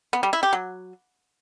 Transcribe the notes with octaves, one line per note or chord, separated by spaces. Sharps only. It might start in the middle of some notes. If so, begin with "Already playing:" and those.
B3
G3
E4
G4
F#3